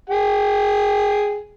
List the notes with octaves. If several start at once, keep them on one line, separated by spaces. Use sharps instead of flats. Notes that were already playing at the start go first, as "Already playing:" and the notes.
G#4 G5